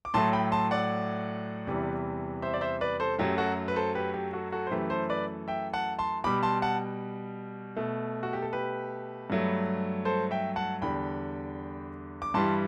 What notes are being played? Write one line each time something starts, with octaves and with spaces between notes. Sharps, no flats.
D6
A2 F#3 A3 A5 C6
G5 B5
A5 C6
D5 F#5
E2 C3 E3 G3
C5 E5
D5
C5 E5
B4 D5
A4 C5
F#2 F#3 A3 G4
F#4 A4
B4
A4 C5
G4 B4
G4
F#4 A4
F#4 A4
C5
F#2 E3 A3 G4 B4
A4 C5
B4 D5
E5 G5
F#5 A5
A5 C6
B2 G3 B5 D6
A5 C6
F#5 A5
B2 A3
F#4
G4
A4
G4 B4
G2 F#3 A3
A4 C5
E5 G5
F#5 A5
E2 D3 G3 G5 B5
D6
G2 E3 G3 A5 C6